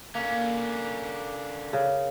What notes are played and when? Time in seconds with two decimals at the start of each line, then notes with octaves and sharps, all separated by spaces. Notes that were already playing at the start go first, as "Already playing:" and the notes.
0.15 D3 A#3 C#4
1.73 C#3